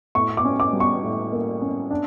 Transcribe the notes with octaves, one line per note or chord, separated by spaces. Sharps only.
A2 C#6
D6
C#4
D6
G3
C#6
A2
A#3
C#4
D4